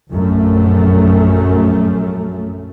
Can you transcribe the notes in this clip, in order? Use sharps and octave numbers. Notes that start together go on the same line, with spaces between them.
A#1 F#2 A3